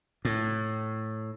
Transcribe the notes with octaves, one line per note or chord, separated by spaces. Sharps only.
A2